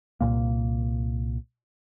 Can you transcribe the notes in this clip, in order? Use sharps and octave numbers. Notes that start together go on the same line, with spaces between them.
C2 G2 A#2 A#3